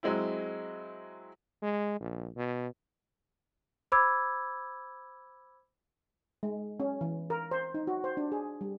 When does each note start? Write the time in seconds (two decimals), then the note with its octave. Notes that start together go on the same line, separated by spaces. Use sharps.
0.03 F#3 G#3 C4 E4
1.62 G#3
2.00 A#1
2.36 B2
3.92 C5 B5 D6 E6 G#6
6.43 G#3
6.80 C#4
7.01 E3
7.30 A#4
7.51 C5
7.74 D#4
7.87 F#4
8.04 C5
8.17 D4
8.32 G#4
8.61 G3